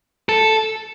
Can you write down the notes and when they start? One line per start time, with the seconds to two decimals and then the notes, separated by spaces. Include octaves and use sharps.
0.29 A4